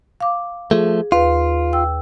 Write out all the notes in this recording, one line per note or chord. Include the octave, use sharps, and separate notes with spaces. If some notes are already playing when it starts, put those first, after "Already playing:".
F5 D6
F3 A3 G#4
D#2 F4 B4 F5
G5 E6